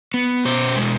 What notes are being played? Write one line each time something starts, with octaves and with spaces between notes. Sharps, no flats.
B3
B2 C5
G#3